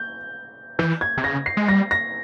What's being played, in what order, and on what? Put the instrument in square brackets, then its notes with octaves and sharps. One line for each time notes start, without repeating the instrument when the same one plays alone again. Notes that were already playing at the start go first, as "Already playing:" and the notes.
Already playing: [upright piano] G6
[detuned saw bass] E3 [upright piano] G6
[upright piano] G#6
[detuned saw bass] C3
[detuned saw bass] C#3 [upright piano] A#6
[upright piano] C7
[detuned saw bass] G#3
[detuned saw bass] G3 [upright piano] A#6
[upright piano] A#6